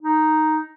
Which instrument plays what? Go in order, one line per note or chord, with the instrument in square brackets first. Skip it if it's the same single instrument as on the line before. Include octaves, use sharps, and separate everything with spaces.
[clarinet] D#4